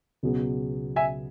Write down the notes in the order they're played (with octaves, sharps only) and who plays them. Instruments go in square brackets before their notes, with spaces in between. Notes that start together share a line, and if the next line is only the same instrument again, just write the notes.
[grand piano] C#2 B2 F#3 B3 G#4
[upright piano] E5 G#5